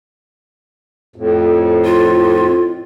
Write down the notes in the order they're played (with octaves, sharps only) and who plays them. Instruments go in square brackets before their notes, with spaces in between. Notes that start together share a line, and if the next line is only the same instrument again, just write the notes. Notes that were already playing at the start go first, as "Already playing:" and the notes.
[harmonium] F2 A2
[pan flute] F4